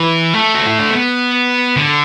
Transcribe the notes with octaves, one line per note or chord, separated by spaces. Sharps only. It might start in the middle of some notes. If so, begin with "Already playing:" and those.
Already playing: E3
A3
F#4
E4
D4
B3
D3